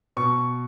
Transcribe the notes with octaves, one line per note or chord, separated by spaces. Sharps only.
B2 C#6